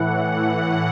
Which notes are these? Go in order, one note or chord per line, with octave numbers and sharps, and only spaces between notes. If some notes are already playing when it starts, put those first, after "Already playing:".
Already playing: A2 E3 F#5